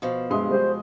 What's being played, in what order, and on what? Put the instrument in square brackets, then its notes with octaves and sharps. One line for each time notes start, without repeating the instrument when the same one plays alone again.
[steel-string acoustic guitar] B2 F3
[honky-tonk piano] G2 E5 [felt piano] G#3 C6 D#6
[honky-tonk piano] G3 G4 [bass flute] C5